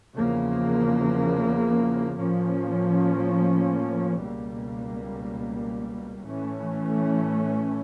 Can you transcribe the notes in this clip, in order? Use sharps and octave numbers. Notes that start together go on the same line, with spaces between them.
E2 C#3 F3 A#3
A2 F3 A#3 C#4
C#2 B2 G3 A#3
A2 E3 A3 C#4